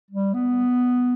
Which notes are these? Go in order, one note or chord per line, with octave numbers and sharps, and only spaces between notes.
G3
B3